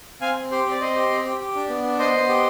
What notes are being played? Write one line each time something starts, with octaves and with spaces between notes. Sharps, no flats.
C4 F5 G#5
C4
G4 C5
C4
D5
C4 C5 D#5
G4
C4
G4
G4
D4
B3
D4
B3 C5 D#5
B3
G4